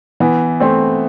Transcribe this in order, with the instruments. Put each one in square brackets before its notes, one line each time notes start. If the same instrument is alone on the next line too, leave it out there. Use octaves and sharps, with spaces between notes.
[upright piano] E3 [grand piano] B3
[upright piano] A3 [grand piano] C4